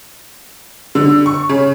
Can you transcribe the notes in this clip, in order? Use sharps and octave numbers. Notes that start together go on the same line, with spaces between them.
D3
C#6
C#3